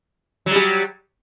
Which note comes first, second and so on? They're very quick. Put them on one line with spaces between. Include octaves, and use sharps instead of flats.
F#3 G3 G4